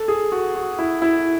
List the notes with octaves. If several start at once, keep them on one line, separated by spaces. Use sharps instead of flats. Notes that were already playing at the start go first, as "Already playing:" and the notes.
Already playing: A4
G#4
F#4
F#4
E4
E4